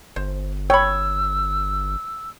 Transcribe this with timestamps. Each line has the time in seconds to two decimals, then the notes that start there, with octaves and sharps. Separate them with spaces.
0.16 G1 C5
0.70 C#5 G5 B5 E6